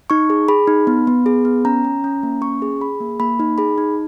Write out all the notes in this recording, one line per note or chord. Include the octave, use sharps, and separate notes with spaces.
D#4 C#6
G#4
G#4 B5
D#4
B3
B3
G#4
B3
C#4 A#5
C#4
C#4
A#3
C#4 C#6
G#4
G#4 B5
A#3
A#3 B5
D#4
G#4 B5
D#4